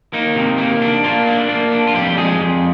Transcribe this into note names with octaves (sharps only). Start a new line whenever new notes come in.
A#3 D#4
C3
A#3
D4
A#3 F4
D4
A#3
D4
F4
F2 G3 G4
F2 G#3 G#4
F2